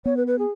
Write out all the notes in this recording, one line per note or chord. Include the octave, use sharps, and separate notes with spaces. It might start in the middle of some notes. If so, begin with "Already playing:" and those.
B3 C#5
B4
B4
G#4